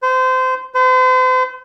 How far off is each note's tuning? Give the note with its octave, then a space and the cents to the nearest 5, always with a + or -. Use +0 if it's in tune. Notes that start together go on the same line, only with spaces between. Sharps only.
C5 -25
C5 -40